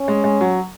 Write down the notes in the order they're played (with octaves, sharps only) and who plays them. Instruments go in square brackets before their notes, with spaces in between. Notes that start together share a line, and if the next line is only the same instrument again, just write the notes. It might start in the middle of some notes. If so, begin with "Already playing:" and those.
Already playing: [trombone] C#4
[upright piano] G#3
G#3
F#3